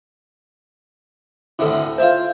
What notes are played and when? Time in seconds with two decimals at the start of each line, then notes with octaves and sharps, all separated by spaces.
1.59 D2 A2 C3 E4 A4
1.98 F4 C5 E5 A5